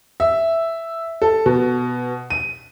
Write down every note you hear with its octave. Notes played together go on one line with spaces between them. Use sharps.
E5
A4
B2
D#7